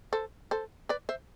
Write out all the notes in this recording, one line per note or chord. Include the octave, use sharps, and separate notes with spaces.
A4 C5
A4 C5
B4 D5
C5 E5